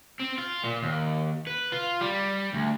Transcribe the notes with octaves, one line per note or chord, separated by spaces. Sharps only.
C4
F4
A#2
D#2
B4
F4
G3
D2